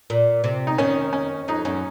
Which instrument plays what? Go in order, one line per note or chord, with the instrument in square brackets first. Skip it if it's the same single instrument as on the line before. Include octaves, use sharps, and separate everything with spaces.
[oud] A#2
C3
[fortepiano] D#4
[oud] D#3 [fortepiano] C#4
[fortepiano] C#4
[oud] F2 [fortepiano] D#4
[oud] F#2 [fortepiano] C#4